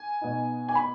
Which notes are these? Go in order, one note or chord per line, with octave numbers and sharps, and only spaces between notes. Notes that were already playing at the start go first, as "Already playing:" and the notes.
Already playing: G#5
B2 B3 D#4
G#5
B5